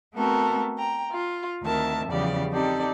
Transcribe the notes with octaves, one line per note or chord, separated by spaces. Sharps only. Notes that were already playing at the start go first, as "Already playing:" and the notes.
A3 B3 C4 F#4 A4 A#4
G5 A#5
F4
D2 D#3 C4 A#4 E5 A5
E2 C#3 F3 G3 G4 D5
C4 D#4 G4 A4 D5